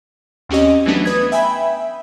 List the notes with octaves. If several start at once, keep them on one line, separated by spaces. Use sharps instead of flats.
D#2 C4 C#4 G4 D#5
E3 F#3 A3 B3 D4
B4 D#6 G#6
E5 G5 G#5 B5